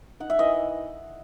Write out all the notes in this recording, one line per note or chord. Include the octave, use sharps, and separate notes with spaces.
D#4 F#5
E5
E3 D#5